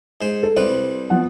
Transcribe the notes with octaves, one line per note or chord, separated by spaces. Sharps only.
G#2 C5
A4
C2 G3 B4 C5
F3 B3 F#5